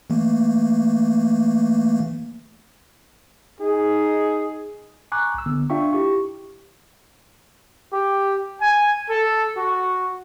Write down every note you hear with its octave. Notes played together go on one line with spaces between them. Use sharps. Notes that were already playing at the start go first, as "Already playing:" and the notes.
E3 A3 A#3
D#4 G#4
G#5 A#5 C#6 D6 F#6
B1 E6
D3 B3
D4 F4 E5 F5 G5 C#6
E4 G4 C#6
G4
G#5
A4
F#4